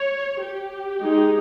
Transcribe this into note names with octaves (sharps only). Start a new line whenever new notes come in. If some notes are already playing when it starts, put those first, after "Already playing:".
Already playing: C#5
G4
G#3 D#4